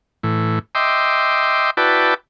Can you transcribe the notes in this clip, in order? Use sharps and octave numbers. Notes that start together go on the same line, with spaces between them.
A2 E3
D#5 E5 G5 C6 D6
E4 F#4 B4 D5 G5 A5